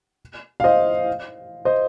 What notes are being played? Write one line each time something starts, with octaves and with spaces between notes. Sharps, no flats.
F5
C5 D#5
C5 D#5